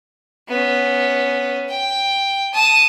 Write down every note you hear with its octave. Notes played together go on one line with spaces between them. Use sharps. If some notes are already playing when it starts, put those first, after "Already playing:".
B3 C#4
G5
A5 D#6